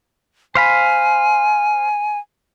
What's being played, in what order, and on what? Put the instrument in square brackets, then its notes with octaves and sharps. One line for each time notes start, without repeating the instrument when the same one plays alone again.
[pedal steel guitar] C5 F5 B5 [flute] G#5